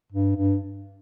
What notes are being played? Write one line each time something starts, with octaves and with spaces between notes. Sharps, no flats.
G2
G2